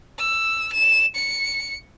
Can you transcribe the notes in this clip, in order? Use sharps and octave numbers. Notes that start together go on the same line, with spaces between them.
E6
E7
C#7